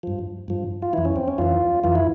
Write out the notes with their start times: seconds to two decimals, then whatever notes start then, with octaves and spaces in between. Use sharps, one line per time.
0.03 G2 F3
0.48 G2 F3
0.82 F4
0.93 F2 E3 E4
1.05 C#4
1.16 C4
1.28 C#4
1.38 F2 E3 F4
1.84 F2 E3 F4
1.95 E4